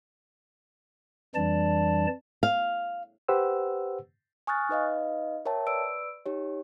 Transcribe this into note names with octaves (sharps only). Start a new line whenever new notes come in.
F2 E3 G3 D4 D5 A5
F5
G4 B4 C5 F#5 E6
G#5 C#6 D#6 F6 F#6 A6
D#4 B4 D#5 F5
A#4 C#5 E5 G5 A5
B4 D5 E6 D7
D#4 G4 C#5